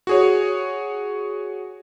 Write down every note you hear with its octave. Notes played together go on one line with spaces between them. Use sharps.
F#4 G#4 C#5